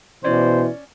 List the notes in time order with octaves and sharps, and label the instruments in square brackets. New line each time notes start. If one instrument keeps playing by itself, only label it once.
[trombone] B2 [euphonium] E3 [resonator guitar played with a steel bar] C#4 D5 [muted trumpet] C5